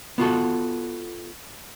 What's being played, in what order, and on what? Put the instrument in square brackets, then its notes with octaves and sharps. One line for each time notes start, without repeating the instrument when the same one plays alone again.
[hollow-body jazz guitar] B3 F4 F#4 A4